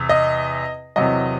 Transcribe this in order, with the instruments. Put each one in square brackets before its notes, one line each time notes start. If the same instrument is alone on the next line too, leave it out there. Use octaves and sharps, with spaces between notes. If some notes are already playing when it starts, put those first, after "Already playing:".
Already playing: [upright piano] E2 C3
D#5
E2 C3 F#3 D#5